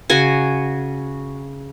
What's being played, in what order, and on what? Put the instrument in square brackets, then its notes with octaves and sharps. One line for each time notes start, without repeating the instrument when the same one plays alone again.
[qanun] C#3 F#4 G#5